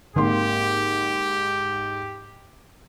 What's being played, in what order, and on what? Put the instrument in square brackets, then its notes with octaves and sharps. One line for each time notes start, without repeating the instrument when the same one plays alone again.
[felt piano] G#2 A#3 C6 [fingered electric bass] D3 C4 [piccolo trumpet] G4